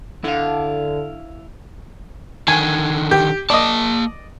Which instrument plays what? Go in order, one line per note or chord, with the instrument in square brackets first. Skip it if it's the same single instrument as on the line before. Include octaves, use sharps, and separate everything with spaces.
[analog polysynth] D3 [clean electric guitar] E4 F5
[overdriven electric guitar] D3 D#3 [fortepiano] G#5
[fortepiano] G4
[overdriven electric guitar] A#3 A5 [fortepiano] D5 D#5